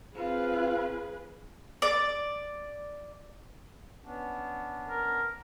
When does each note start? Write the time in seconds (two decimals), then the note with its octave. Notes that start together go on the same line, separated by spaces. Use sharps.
0.15 C4 F4 G#4 B4
1.82 D5
4.03 B3 C#4 D4
4.89 A#4